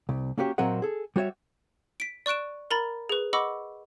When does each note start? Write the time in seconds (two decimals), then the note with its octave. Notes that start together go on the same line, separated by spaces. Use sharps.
0.09 C2
0.38 A#3 C#4 F#4 G4 C#5
0.58 A#2 F#3 C4 A#4 D#5 F#5
0.82 G#4 A4
1.16 G3 F#4 C#5 E5
2.00 B6 D7
2.26 D5 C#6 F#6 D7 E7
2.71 A#4 A#5 B5 A6
3.09 G#4 B4
3.33 D#5 F#5 B5 C#6 D6 E6